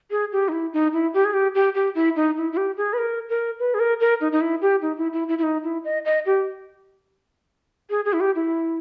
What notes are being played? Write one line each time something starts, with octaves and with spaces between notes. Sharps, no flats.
G#4
G4
D#4
E4
D#4
E4
G4
G#4
G4
G4
G4
E4
D#4
E4
E4
G4
G#4
B4
A#4
A#4
B4
G#4
A#4
A#4
D#4
D#4
E4
G4
D#4
E4
E4
E4
E4
D#4
E4
D#5
D#5
G4
G#4
G#4
E4
G4
E4